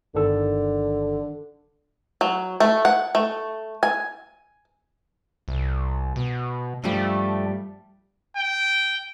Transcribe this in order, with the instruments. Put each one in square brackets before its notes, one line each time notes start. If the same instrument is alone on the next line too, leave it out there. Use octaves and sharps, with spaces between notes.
[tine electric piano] G1 D#3 A4 [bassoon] D3
[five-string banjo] F#3
A3
F#5
A3
G#5
[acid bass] C2
B2
[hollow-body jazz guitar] G2 F3 G3 [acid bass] A3
[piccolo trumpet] G5